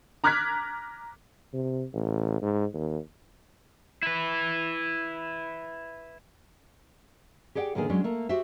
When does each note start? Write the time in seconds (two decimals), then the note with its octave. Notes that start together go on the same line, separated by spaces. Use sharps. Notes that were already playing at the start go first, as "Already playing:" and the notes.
0.24 A#5 D6 F6 F#6 G#6 B6
1.53 C3
1.94 A1
2.42 G#2
2.74 D#2
4.03 E4 B4
7.55 G4 G#4 D5 F#5 G5
7.75 A2 D3 D#3 A#3 B3 G#4
7.89 F#3 G#3 C#4 D4
8.04 A3 A#3
8.29 F#4 G4 C5 E5